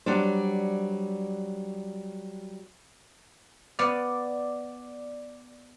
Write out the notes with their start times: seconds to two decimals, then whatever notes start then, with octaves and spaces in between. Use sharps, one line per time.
0.06 F#3 G3 D4 C5
3.79 B3 D5 F5